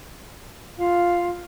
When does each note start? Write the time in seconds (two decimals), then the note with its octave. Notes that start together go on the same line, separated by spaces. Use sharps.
0.78 F4 F5